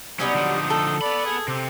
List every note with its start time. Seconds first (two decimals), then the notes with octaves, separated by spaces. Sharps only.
0.20 F#3 G3 B3 C#4 D#4
0.34 D3 F3
0.70 D#4 A4
1.02 B3 D5 B5
1.26 G#4
1.48 C3 C4